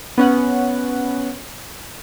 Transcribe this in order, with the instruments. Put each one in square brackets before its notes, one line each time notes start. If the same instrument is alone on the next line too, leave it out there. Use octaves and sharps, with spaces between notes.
[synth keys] B3 C#4 F#5